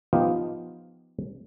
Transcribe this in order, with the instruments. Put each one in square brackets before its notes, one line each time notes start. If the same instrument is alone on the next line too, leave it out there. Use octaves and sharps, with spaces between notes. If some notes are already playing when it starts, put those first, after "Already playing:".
[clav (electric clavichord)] F3 B3 D#4 F4 G4